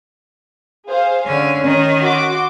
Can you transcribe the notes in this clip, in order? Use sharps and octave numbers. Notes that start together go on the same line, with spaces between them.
G#4 C5 F5
D3 C#4 C#5
D#3 C#4
F#4 C6 D6